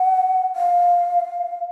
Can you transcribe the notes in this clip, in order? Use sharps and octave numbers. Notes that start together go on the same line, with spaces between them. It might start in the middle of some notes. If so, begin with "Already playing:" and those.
Already playing: F#5
F5